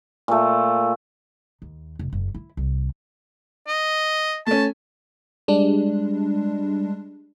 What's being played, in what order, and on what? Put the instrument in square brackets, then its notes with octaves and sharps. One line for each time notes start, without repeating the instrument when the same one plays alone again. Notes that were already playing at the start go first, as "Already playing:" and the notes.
[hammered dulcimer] A#2 A3
[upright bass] D#2
F1
F#1
E4
C2
[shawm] D#5
[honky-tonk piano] A3 C#4 [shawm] A5
[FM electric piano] G3 G#3 D4